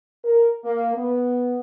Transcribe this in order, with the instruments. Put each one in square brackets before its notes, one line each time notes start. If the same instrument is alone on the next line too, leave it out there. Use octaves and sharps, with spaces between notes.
[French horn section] A#4
A#3
B3